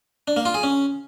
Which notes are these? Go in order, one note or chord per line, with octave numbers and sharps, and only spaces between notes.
D4
A#3
F4
G#4
C#4